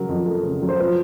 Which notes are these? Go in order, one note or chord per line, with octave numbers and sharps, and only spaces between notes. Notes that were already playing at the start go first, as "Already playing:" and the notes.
Already playing: C#3 F#3 A#4
F2
A3
C#3
F#3
C5
F3 B4